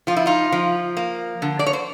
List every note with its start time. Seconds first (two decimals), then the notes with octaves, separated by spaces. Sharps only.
0.07 F3 F4
0.16 E4
0.26 D#4 F4
0.52 F3
0.97 A#3
1.42 D3
1.59 D5
1.66 C#5
1.73 C5